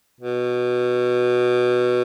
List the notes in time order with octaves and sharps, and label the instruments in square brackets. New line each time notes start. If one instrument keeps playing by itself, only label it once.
[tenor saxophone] B2